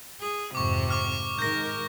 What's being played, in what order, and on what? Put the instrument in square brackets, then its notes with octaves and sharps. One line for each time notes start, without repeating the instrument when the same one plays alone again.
[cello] G#4
[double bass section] F2 G#2 [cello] C3 [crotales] C#6 D6
[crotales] C#6 D6 F6
[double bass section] G#2 D#3 [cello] A#4 [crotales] G6 A#6